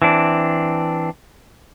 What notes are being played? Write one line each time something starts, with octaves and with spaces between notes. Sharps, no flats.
E3 C4 D4